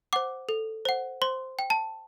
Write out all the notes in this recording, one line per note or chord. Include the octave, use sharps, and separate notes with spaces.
C5 F#5 D6
A4
C5 F#5
C5 C6
G5
A5